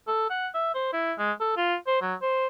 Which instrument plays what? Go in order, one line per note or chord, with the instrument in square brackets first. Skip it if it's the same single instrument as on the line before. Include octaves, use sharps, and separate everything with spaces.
[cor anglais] A4
F#5
E5
C5
E4
G#3
A4
F4
C5
F#3
C5